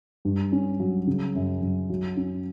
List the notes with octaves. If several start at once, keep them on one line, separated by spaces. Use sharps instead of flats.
G2
C#4
F#3
C#3
F#2
F#2
F#3
C#4